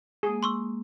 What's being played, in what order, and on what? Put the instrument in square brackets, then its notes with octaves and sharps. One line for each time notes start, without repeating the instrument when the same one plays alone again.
[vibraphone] G#3 A#3 [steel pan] G#4
[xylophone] C6 C#6 E6